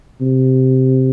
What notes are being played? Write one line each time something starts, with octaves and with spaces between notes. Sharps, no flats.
C3